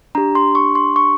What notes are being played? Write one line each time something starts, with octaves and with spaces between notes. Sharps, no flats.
D4 G4 A#5
C6
C#6
C6
C#6